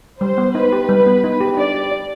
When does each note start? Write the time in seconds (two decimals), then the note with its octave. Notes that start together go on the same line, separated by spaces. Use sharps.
0.21 G3 C5
0.38 B3
0.55 D#4 B4
0.72 G4
0.89 G3
1.06 B3
1.24 D#4
1.40 G4
1.57 D4 D5
1.74 G4
1.91 D5